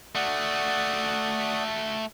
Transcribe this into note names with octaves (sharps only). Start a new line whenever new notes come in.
A3 F#4 D5 F#5 D#6